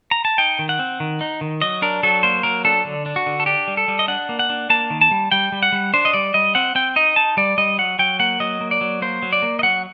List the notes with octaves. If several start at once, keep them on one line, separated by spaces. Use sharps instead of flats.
A#5
A5
D#4 G5
D#3
F#5
C4
D#3
D#4
D#3
F#3 D#5
D4 A#4
F#3 A4
A#3 C5
F#3 A#4
D4 A4
D3
D4
F#4
D3
A4
D4 G4
G3
A4
G3
D#5
D4 F#5
A#3
F#5
D4
A#3 A5
D#3
A5
G3
G3 G5
G3
F#5
G3
D4 C5
D#5
G3 D5
G3 D#5
C4 F#5
C4 G5
D#4 D#5
D#4 A5
G3 D5
G3 D#5
F#3 F#5
F#3 G5
A#3 F#5
F#3 D#5
A#3
D5
F#3
A#3 C5
F#3
D5
A#3
D#5
F#3 F#5